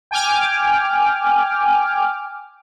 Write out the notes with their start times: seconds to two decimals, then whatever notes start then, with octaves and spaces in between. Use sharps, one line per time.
0.11 G5 G#5 D6 F6